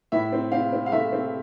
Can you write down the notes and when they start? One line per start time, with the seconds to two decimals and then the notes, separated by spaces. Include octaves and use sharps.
0.12 A2 E5
0.32 C4
0.52 C4 F5
0.72 C4
0.86 F5
0.92 A3 E5
1.12 C4